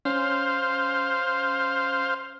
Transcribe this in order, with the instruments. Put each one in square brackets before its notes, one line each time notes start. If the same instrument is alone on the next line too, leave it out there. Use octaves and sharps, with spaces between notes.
[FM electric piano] C#4 [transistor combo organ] C5 F5